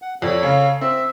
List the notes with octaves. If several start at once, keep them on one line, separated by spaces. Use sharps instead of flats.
F#5
F2 A4 C#5 D5
C#3 F5
C4 E5 E6